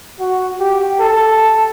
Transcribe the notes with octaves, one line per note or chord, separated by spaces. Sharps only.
F#4
G4
A4